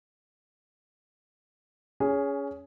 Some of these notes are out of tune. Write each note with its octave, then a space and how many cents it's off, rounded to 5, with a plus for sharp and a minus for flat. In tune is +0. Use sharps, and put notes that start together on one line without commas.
C#4 +20 G#4 +0